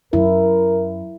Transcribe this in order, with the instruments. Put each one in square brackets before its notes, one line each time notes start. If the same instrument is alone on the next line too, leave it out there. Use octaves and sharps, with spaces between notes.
[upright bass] F#2 [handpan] E4 [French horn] A#4